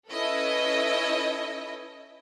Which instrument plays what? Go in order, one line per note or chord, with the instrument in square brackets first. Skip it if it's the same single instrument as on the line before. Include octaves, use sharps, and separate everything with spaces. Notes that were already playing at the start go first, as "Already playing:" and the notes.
[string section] C#4 E4 A4 B4 D#5 E5